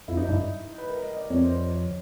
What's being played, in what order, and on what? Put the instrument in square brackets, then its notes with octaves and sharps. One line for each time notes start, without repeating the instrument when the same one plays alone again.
[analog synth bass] F2 [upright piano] E4
[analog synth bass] F#2 [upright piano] D#4
[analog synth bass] G2 [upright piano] E4
[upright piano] B4
A#4
D#5
D5
[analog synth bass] F2 [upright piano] C#5
[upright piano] C5
C5
C#5